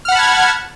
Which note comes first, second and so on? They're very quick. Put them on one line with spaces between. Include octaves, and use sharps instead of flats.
F6 F#5 B5 A5 G#6